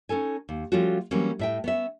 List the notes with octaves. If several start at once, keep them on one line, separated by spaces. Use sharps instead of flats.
C#4 D#4 A4 G#5
D#2
F3 G3 A3 C#4 F4 F#4
E3 F#3 G3 A#3 C4 C#4
A2 E5 G5
B3 C#4 E5